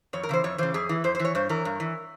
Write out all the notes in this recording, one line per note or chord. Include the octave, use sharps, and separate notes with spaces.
F2 C#5
A#4
C#3 E3 C5
F2 C#5
C#3 E3 C5
F2 G#4
E3
F2 C5
C5
E3
C#5
G2 C5
E3 A#4
G2
E3